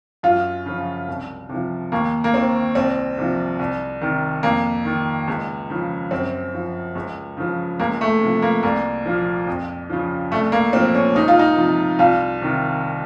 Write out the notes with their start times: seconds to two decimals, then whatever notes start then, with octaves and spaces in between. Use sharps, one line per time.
0.23 F#2 F4
0.66 C#3 F3
1.08 C2
1.49 C3 F3
1.92 D#2 A#3
2.24 A#3
2.34 D#3 C4
2.75 C2 C4
3.18 C3 F3
3.59 C2
4.01 C3 D#3
4.43 F2 A#3
4.85 D#3
5.28 C#2
5.70 C#3 F3
6.11 F#2 C4
6.54 F3
6.95 C#2
7.37 C#3 F3
7.79 C#2 A#3
8.01 A3
8.21 C3 F3
8.42 A#3
8.63 C2 A#3
9.06 A#2 F3
9.47 F2
9.90 C#3 F3
10.31 C2 A3
10.52 A#3
10.73 A#2 C4
10.76 F3
10.95 C#4
11.15 C#2 D#4
11.28 F4
11.39 D#4
11.57 C3 F3
11.99 C2 F4
12.41 C3 D#3